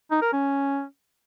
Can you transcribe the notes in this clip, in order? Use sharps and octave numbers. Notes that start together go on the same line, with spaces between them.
D#4
A#4
C#4